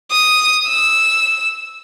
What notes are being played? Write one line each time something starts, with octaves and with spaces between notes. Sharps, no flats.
D#6
E6